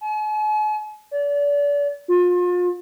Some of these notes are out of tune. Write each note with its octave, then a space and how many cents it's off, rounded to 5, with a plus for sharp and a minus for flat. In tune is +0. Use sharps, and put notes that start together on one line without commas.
G#5 +45
D5 -35
F4 +35